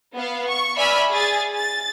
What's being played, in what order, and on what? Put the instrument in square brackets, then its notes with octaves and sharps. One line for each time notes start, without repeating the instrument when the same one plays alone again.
[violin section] B3 F5
C#6
D5 E5 G#5 B5 F6
G#4 G#5 A6
A6